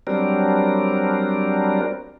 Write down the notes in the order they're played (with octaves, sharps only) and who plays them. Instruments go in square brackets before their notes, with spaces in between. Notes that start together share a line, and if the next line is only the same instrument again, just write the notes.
[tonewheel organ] F#3 G3 C4 D4 A#4